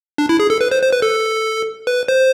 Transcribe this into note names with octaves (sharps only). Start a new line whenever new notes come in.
D4
E4
G#4
A4
B4
C5
C5
B4
A4
B4
C5